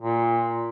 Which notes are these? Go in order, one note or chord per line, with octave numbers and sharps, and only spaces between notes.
A#2